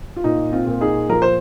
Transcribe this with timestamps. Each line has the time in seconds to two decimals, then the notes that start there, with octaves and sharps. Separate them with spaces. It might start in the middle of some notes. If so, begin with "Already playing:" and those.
0.16 F4
0.24 A#2 D#4
0.53 C4 F4
0.66 A#2
0.81 D#4 G#4
1.09 F3 A#4
1.22 C5